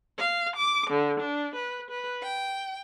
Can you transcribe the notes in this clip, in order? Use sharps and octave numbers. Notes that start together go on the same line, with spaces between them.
F5
D6
D3
D4
B4
B4
G5